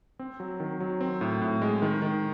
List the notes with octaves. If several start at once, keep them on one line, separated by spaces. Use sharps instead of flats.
C4
F#3
D#3
F#3
C4
A2
A2
G#3
D#3
D#3